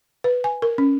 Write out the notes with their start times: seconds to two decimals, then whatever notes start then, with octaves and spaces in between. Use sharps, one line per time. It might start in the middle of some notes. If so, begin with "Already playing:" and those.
0.24 B4
0.44 G#5
0.62 A#4
0.78 C#4